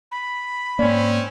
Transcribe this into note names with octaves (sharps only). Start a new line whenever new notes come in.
B5
G#2 A#3 C4 C#4 D5